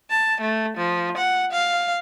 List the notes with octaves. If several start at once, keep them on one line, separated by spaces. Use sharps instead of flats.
A5
A3
F3
F#5
F5